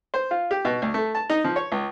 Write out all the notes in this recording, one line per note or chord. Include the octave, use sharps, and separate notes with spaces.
C5
F4
G4
B2
D2
A3
A5
D#4
F3
C#5
C#2